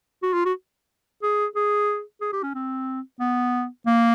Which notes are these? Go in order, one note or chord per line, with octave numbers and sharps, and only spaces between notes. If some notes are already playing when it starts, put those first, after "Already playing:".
F#4
F4
F#4
G#4
G#4
G#4
G4
C#4
C4
B3
A#3